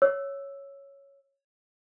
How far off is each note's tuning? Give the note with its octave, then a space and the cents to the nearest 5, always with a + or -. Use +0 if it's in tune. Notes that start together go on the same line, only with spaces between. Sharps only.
C#5 +0 E6 +0